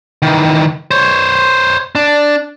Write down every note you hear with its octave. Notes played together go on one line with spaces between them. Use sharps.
D#3 E3
C5 C#5
D4